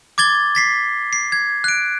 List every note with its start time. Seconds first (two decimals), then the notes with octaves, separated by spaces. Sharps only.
0.18 D6 G#6 A6 G7
0.55 A6 B6 C7
1.13 C7
1.32 G#6
1.64 F#6 D7